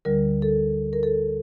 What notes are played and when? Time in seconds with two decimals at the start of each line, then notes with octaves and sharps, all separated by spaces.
0.05 D2 D3 G3 A#4
0.42 A4
0.93 A#4
1.03 A4